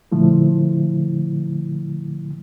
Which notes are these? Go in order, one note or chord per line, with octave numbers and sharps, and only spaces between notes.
A#2 D3 F3 A3 E4